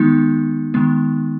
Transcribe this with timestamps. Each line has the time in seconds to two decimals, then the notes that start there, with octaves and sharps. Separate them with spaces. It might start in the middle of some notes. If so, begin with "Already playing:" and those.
Already playing: D#3 G#3 B3 D#4
0.74 D#3 G#3 B3